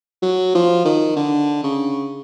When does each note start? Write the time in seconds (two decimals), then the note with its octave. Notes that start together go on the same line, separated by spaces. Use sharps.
0.22 F#3
0.55 F3
0.85 D#3
1.16 D3
1.63 C#3